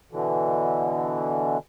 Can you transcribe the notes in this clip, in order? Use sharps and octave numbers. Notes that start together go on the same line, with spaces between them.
B2 D3 E3